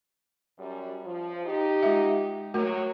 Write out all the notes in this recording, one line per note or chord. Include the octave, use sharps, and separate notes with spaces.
F#2 G3
F3
D#4 G4
G#3 F4 E5
F#3 A3 F#4 A#4